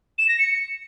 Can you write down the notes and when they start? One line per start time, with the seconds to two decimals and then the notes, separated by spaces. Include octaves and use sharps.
0.18 E7
0.28 A#6
0.38 C#7